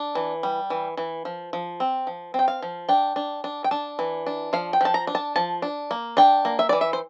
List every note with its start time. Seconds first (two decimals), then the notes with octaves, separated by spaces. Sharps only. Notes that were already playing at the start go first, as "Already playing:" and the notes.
Already playing: D4
0.15 E3
0.43 G3
0.70 E3
0.97 E3
1.25 F3
1.53 F3
1.80 C4
2.07 F3
2.34 C4 G5
2.48 F5
2.62 F3
2.89 D4 G5
3.16 D4
3.44 D4
3.64 G5
3.71 D4 A5
3.99 E3
4.26 D4
4.53 F3 F5
4.73 G5
4.81 F3 A5
4.94 A#5
5.07 D4
5.15 A5
5.36 F3 A5
5.62 D4
5.91 A#3
6.17 D4 G5
6.45 A#3
6.59 E5
6.69 E3 D5
6.81 E5
6.93 C5